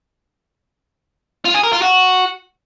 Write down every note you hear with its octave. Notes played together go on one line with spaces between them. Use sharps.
F4
G#4
A#4
F4
F#4